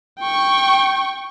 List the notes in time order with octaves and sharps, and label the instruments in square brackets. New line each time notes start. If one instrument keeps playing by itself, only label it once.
[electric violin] G5 C#6